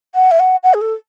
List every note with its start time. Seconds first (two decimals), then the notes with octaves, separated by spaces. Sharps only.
0.15 F#5
0.31 E5
0.39 F#5
0.63 F#5
0.74 G#4
0.81 A4